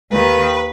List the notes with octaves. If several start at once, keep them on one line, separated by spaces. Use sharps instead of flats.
D#2 D#3 B4